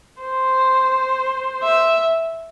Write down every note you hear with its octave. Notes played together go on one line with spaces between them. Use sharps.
C5
E5